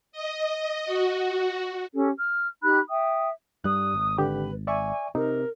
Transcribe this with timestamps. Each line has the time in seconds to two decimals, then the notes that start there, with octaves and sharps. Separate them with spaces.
0.12 D#5
0.86 F#4
1.95 C#4 G4 A4
2.18 F6
2.62 D#4 G4 B5 F#6
2.89 E5 G5 D#6
3.64 G2 G3 D#6 F#6
3.94 G#1
4.18 D3 G4 B4
4.67 D5 E5 G#5 C#6
5.15 C3 D#4 A#4